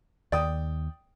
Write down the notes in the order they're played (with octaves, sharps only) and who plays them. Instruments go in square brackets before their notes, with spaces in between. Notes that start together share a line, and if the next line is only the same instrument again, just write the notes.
[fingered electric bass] D#2 D#3 [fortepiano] D5 G5 D#6